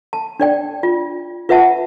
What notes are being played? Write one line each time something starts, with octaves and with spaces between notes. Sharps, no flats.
A5
D4 D5 G5
F4
F4 B4 E5 F#5 A5